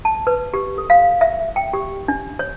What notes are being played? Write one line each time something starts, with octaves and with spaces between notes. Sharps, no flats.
A5
B4
G4
A4
F5
E5
G5
G4
D4
C#5